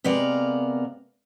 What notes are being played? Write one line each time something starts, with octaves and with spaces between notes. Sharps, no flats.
C3 G#3 B3 A#4 D5 F5